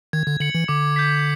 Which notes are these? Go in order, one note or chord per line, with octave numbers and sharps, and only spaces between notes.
D#3 G#6
D3
D3 C#7 F#7
E3
D3 D6
G6 B6